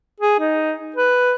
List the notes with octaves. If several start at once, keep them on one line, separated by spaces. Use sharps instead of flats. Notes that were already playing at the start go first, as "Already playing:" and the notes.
G#4
D#4
B4